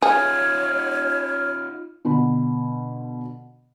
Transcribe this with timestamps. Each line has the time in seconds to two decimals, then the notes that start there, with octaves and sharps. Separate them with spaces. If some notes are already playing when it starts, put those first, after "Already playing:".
0.02 D#4 F4 G#4 C#5 F6
2.05 B2 D3 B5